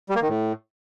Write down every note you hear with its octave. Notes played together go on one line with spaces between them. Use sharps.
G3
A#3
D#3
A2